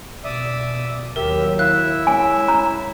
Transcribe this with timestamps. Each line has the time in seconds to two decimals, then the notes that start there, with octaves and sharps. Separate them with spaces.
0.24 B2 D5 E5 D#6
1.16 D#2 F#3 G4 A#4 E5
1.59 E4 E5 F5 F#6
2.07 G#3 C#4 G#5
2.48 A#5